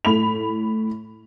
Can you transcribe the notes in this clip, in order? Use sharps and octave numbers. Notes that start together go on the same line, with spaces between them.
A2 B5 F7